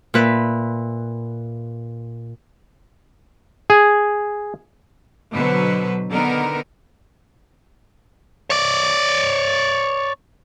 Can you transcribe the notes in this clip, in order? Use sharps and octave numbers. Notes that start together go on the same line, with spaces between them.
A#2 B4 E5
G#4
B2 D3 F#3 B4 C5
D3 D#3 B3 D#4 A#4
C#5 D5